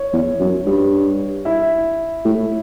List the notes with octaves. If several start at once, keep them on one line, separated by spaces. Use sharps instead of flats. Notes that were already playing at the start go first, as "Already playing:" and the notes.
Already playing: C#5
E2
F#2
G2
E4 E5
A2